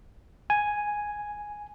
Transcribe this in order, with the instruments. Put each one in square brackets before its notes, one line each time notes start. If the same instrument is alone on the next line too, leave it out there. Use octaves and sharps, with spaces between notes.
[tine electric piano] G#5